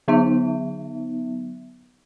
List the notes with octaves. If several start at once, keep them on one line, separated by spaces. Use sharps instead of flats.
D3 F#3 B3 D#4 E5